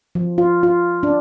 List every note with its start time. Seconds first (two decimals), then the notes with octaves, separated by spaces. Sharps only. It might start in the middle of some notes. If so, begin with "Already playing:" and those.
0.15 F3
0.38 F4
0.63 F4
1.03 D4